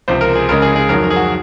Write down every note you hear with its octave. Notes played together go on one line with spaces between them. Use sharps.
C#2 C3 F3 C5
A#4
G#4
C#2 C#3 G#3 A#4
G#4
G#4
F2 D#3 F#3 A#4
A#4
G#4
F#4